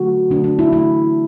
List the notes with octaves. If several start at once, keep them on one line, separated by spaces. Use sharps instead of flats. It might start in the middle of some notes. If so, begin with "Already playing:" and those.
Already playing: D3 F#3 A3 F#4
D3 F#3 A3 D4
D4
E4
D3 F#3 A3 E4